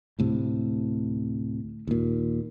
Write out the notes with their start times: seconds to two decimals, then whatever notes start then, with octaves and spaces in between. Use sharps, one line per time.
0.19 D2 A2 C3
1.87 D#2 A#2